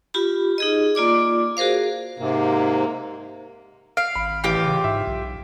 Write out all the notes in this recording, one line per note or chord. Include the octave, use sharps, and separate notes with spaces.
F4 G4 B5
D#4 G#4 D#5
A#3 F4 D5 D6
F#4 G#4 A#4 C5 F5
G#2 C3 A#3
F5 D7
G#1 B5
A1 E3 F4 G4
C#3
G#2 E5
B1